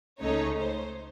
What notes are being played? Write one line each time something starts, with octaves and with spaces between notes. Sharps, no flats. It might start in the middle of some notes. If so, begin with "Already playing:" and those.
C#2 C#3 A3 D#4 C#5
C5